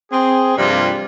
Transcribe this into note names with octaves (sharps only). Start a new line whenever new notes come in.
C4 G#4
G2 C3 F3 G3 A#3 F4